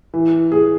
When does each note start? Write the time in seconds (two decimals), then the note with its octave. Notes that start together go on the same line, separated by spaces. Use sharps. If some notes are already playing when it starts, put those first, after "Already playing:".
0.14 E3
0.52 G#4